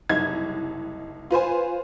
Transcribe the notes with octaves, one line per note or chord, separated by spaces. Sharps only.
F#1 C2 D#4 G#6
F4 B4 C5 G#5